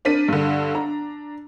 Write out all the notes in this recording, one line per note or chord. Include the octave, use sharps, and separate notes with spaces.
C4 D4 A#4 B6 D#7
G2 D3
D4 A#5